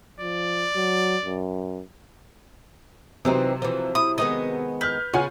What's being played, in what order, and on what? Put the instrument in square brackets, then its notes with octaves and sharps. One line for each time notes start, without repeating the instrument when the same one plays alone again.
[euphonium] F3 [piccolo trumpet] D5
[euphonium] F#3
F#2
[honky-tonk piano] C3 F#3 [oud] E3 C4 D#4
[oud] E3 F3
[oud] E4 [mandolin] D#6
[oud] D#3 G#3 B3 [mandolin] D#5
[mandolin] B4 [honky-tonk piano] F6 G6
[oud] C#3 [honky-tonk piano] F4 F#5 G#5